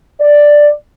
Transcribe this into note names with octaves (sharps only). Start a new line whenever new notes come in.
D5